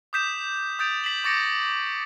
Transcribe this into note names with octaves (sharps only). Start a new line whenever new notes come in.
D6 D#6 G6 B6 E7
D#6 G6 A6 D7 F7
B6 E7 F#7
C#6 D6 A6 A#6 C#7 D7